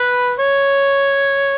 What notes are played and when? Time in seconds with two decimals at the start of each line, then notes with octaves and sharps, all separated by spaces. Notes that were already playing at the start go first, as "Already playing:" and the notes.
Already playing: B4
0.39 C#5